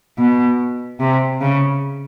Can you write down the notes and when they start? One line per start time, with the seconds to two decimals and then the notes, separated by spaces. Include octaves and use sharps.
0.18 B2
1.00 C3
1.41 C#3